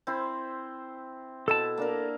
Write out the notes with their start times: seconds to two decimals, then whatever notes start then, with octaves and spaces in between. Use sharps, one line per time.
0.07 C4 E4 C5
1.48 B2 E4 A4 A5
1.77 A#3 D4 A#4